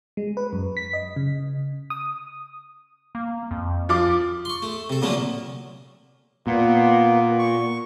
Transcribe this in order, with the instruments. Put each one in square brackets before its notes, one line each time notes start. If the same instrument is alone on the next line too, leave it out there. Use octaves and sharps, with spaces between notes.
[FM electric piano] G#3
B4
F#2
B6
D#5
C#3
D#6
[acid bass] A#3
F2
[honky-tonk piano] F3 F4 D6
[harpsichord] C6 C#6
A3
C3 A4
A#2 D3 F3 F#3 A3 A#3
[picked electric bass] A#2 [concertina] A#3 B3
[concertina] C#6